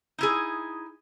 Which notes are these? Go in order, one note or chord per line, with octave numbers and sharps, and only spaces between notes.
D#4 E4 G#4